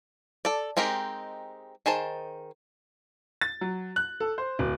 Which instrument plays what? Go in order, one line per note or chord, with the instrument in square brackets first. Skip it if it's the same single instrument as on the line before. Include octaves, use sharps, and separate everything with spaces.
[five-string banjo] A4 D5
G#3 C4 D#4 G4 A#4
D#3 G#4 C5 A5
[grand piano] A6
F#3
F#6
A4
C5
D1